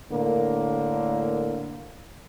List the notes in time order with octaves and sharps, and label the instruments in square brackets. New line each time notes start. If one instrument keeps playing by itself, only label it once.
[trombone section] A2 D3 A#3